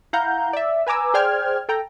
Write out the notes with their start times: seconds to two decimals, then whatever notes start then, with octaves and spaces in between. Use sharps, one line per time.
0.13 E4 F5 F#5 A#5 G6
0.53 D5 E5
0.87 B4 G#5 A#5 D6 E6
1.14 G#4 C5 D5 G5 F6 G#6
1.69 A4 G5 A#5